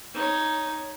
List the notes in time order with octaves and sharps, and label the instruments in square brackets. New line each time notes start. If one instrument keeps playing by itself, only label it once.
[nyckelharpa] D#4 C#5